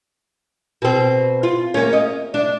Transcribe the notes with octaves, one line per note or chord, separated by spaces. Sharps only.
B2 C4
F4
A#3 C#4
D#5
D4